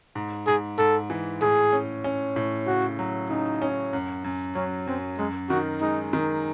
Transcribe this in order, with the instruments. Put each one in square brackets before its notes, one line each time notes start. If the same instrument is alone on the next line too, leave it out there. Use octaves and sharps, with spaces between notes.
[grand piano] G#2
[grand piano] G#2 [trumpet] G#4
[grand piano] G#2 [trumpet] A4
[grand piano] E3
[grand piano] A2 [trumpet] G#4
[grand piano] C#4
C#4
A2
[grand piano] C#3 [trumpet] F#4
[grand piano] F#3
[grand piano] C#3 [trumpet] D#4
[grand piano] C#4
F#2
F#2
[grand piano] F#3 [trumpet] C#4
[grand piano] F#2 [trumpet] C4
[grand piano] F#2 [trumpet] G#3
[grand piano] D#3 [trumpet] F#4
[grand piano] G#3 [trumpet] D#4
[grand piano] D#3